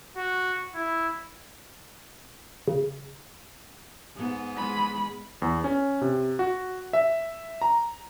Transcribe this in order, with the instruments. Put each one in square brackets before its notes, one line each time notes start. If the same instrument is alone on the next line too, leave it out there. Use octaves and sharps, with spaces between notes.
[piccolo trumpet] F#4
E4
[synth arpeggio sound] C#3
[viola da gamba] G#2 B3
[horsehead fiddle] G#3 B5
[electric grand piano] E2
C#4
C3
F#4
E5
A#5